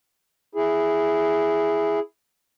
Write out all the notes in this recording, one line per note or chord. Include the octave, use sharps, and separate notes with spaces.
E4 G#4